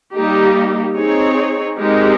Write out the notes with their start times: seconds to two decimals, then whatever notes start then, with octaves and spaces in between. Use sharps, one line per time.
0.14 G3 A#3 D#4 G4
0.96 C4 D#4 G#4 C#5
1.79 G#3 C4 D#4 G4 A#4